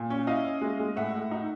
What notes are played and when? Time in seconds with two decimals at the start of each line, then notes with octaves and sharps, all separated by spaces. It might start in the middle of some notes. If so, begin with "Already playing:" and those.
Already playing: A#2
0.10 C#4
0.27 E4 D#5 F5
0.45 C#4
0.61 G#3
0.80 G#3
0.96 A2 E5 F#5
1.14 A2
1.31 D#4